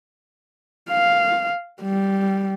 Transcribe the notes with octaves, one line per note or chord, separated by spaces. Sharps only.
F5
G3